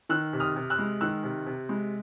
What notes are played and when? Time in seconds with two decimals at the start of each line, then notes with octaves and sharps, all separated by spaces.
0.09 D#3 E6 F#6
0.33 C3
0.40 D#6 F6
0.56 C3
0.70 E6 F#6
0.79 G#3
1.01 D#3 E6 F#6
1.24 C3
1.46 C3
1.69 G#3